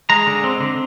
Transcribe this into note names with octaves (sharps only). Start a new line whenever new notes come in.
G#3 A#5
D3
C4
D3